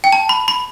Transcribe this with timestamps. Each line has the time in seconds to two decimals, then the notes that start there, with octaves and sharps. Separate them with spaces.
0.04 G5
0.12 A5
0.29 B5
0.48 B5